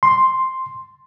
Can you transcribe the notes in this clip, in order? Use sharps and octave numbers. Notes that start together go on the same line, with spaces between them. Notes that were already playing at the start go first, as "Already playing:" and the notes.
C6